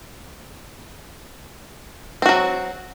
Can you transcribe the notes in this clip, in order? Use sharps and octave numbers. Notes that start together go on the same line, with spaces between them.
F#3 C4 F#4